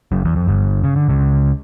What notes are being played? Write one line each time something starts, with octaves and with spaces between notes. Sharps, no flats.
F#1 F#2
E2
F2
G1 G2
C#3
D3
C#2 C#3